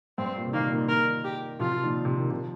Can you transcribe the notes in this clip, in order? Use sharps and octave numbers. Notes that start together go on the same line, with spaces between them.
G2 C4
A#2
C3
A#2 D#3 A#3
A#2 D#3
A#2 D#3 A#4
G4
C3 F3 F4
C3 F3
A#2 D#3
C3
D#3
C3 F3